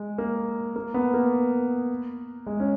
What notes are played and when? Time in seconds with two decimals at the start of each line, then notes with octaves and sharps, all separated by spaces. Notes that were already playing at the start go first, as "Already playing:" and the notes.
Already playing: G#3
0.18 A#3
0.76 A#3
0.94 B3
1.14 A#3
2.47 G#3
2.60 C#4